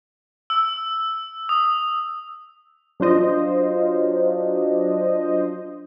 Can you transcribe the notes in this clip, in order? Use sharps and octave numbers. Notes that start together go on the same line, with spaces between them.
E6
D#6
F#3 D4 F4 C5 D#5